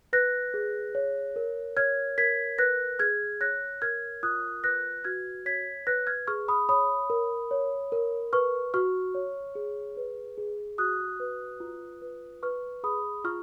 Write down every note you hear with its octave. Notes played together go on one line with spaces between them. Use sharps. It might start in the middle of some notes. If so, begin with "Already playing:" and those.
B4 F#6 A#6
G#4
C#5
A#4
C#5 F6 G#6
A#4 G#6 B6
B4 F#6 A#6
G#4 F6 G#6
C#5 F#6 A#6
A#4 F6 G#6
F4 D#6 F#6
B4 F#6 A#6
F#4 F6 G#6
C#5 G#6 B6
B4 F#6 A#6
F6 G#6
G#4 C#6 F6
B5 D#6
C#5 B5 D#6
A#4
C#5
A#4
B4 C#6 F6
F#4 C#6 F6
C#5
G#4
B4
G#4
F#4 D#6 F#6
B4
F4
B4
B4 C#6 F6
G#4 B5 D#6
F4 C#6 F6